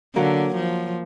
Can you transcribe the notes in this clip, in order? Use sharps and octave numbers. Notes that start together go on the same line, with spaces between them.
D3 F#3 A#3
F3